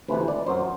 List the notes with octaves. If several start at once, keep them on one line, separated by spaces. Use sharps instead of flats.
D2 C3 E3 B4
D5
F#2 F#3 C5